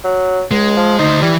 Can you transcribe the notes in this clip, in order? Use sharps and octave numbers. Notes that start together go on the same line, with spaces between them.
F#3
C#2 G#3
F3
D2 D#4 C5
E3 G3